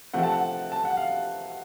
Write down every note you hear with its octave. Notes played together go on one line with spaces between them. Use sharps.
C3 F3 A3 C4 F#5
A5
F#5
A5
F#5
F5